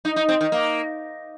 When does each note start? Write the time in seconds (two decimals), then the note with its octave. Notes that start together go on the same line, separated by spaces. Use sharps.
0.05 D#4
0.16 D#4
0.29 C4
0.41 D#3
0.52 A#3